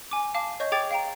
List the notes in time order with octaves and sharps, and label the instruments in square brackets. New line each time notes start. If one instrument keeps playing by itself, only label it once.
[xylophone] G#5 D6
F5 A5 D6
C#5 D#5 C#6 G6
G#4 G5 D6 G#6 A6
F5 G5 A#5